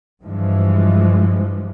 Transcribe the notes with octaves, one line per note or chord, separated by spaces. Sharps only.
G2 E3 F3 G#3